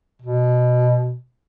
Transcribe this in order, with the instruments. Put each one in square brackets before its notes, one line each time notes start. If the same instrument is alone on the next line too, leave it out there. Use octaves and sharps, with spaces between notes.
[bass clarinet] B2